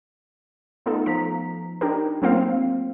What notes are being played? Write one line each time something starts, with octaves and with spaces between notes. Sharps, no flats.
A3 B3 D#4 F4 A4
F3 A#5 B6
D4 D#4 G4 A#4
F#3 A3 A#3 C4 F4 F5